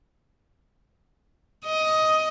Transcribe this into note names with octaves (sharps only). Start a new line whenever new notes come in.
D#5